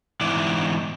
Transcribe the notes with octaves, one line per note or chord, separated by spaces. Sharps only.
G#2 E3 D5